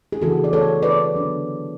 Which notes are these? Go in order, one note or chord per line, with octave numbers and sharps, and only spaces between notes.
G#4
C#3 E3 B3 D4 F#4 A4
D5
A4 C#5
B4 D5
D3 F#3 B3 D4